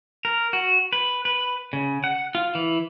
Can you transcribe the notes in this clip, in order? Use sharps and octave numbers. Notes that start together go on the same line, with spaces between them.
A#4
F#4
B4
B4
C#3
F#5
F4
E3